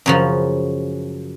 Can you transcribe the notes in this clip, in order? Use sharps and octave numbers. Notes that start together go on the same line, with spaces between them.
F#2 C#3 F3